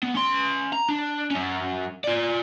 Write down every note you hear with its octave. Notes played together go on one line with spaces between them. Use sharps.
B3
C#4 C6
A#5
D4
F#3 C#4
F4 D5